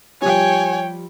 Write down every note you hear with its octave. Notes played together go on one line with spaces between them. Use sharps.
F3 G3 C#5 G5 G#5